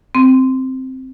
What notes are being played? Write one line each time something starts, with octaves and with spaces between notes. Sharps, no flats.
C4